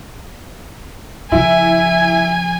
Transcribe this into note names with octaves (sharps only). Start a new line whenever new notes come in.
C#3 F3 E4 G#5